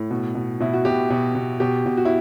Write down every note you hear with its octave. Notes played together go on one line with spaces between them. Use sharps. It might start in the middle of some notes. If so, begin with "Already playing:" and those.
Already playing: A2
B2
B2
B2 E4
F#4
B2 G4
B2
B2
B2 G4
B2
F#4
E4